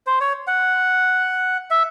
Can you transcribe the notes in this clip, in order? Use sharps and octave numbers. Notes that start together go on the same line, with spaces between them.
C5
C#5
F#5
E5